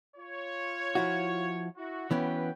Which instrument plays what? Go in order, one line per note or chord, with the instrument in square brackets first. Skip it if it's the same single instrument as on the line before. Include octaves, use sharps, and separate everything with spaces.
[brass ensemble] F4 C#5
[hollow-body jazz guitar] F3 E4 F#4
[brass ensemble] E4 F#4
[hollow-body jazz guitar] E3 B3 C#4 [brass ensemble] F#4 B4 G5